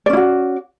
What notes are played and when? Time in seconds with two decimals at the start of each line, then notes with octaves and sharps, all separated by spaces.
0.06 D5
0.10 C#4
0.13 E4
0.17 F#4